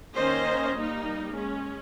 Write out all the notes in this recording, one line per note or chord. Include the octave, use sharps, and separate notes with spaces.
D#3 A#3 C#4 C5 D#5
G3 A#3 D#4
G#3 C#4